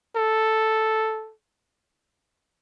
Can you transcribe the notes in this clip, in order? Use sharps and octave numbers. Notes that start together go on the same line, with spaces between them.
A4